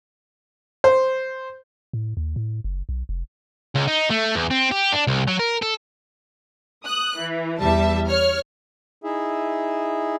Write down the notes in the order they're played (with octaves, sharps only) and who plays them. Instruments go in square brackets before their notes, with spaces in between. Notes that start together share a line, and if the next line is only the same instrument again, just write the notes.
[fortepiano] C5
[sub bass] A2
D#2
A2
F#1
B1
F1
[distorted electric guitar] C#2
D#4
A3
E2
C4
G4
D4
C2
F#3
A#4
A4
[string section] D#6 F#6
E3
E2 G3 E5 A5
C#5 F6
[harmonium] D#4 E4 G#4 E5